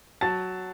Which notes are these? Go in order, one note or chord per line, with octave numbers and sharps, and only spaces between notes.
F#3 A5 A6